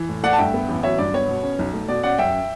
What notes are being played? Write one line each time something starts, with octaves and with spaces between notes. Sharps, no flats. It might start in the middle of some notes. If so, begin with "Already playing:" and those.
Already playing: E3
A2
A3 D5 F#5
A5
G2 E5 G5
B3
A1
F#3 C#5 E5
G2 D5
B3 C#5
B2
C#4
B1
A3
B2 D5
C#4 D5 F#5
F#2 E5 G5